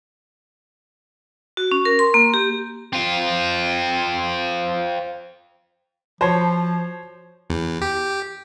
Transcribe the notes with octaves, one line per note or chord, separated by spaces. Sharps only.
F#4
C#4
A#4
C6
A#3
G4
C4 F4
F3 F4 F#4 C5 C#5 A5
E2
G4